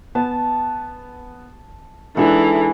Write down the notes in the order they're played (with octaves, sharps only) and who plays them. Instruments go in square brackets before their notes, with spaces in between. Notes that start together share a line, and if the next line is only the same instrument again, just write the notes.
[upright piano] B3 [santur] A5
[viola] E3 [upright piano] G#3 D4 D#4 [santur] G#4 F#5 [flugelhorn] A4